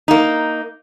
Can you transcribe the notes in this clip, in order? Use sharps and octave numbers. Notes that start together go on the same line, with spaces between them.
A#3 D#4